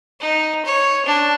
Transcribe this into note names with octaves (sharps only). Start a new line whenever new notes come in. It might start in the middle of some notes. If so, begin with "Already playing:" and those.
D#4
C#5
D4